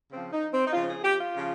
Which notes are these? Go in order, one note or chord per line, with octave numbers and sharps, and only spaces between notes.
C#3 F3 C4
D#4
C4
D#4
C#3 F3 F4
G#4
G4
F4
C#3 F3